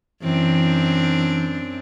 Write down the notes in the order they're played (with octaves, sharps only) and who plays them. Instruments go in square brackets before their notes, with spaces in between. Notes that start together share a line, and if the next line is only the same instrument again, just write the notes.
[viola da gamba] F#2 C4 D4 [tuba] E3